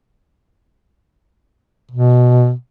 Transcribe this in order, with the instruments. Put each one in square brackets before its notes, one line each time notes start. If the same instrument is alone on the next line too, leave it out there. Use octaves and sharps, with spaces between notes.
[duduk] B2